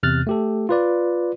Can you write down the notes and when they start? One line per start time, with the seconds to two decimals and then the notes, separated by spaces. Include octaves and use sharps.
0.03 E2 C3 F6 F#6 A6
0.27 A3 G4 A4
0.69 F4 B4 D5